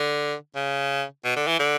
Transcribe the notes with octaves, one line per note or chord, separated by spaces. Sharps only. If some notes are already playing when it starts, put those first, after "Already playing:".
Already playing: D3
C#3
B2
D3
E3
D3